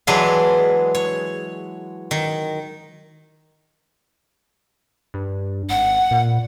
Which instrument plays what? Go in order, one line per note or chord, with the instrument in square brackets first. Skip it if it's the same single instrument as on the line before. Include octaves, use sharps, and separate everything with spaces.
[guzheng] E3 F#3 G#3 D4 G#4 B4
C#5
D#3
[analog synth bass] G2
[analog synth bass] G#1 [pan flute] F#5
[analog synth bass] A#2